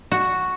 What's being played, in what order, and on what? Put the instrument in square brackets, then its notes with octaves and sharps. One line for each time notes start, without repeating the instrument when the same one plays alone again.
[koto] F#4